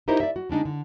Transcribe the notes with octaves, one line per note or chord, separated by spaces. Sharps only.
D#4 E4 G4 A#4 C5 D#5
D5 E5
F#4
D3 G#3 D4 D#4
D3